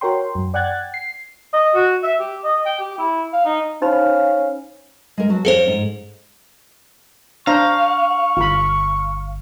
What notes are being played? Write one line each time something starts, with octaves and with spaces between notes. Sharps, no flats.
F#4 A#4 C#5 G5 C6
F#2
D5 F#5 G5 F#6 G#6 A6
C7
D#5
F#4
E5
G4
D#5
G5
G4
E4
F5
D#4
C#4 D#4 C5 F5 B5
G#3 A#4
F#3 F#4 A5
F2 C#4 G#4 A4 C5
G#2
D4 C5 F5 A#5 C#6
G1 F4 B5